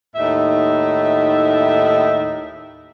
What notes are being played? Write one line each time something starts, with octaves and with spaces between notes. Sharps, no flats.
D#2 A2 D#4 E5